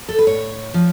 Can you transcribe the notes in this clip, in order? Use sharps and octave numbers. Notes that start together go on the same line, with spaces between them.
A4
B4
A2 C#5
F3